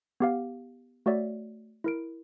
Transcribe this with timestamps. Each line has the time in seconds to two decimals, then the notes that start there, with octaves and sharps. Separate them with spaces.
0.20 B3 G4 F5
1.06 A3 F#4 C#5 D5 E5
1.84 E4 A#4 D7